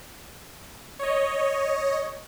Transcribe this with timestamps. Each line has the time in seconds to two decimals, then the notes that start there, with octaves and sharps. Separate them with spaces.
0.99 C#5 D#5